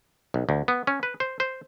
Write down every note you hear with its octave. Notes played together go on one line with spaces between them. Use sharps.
B1
D2
B3
C#4
B4
C5
C5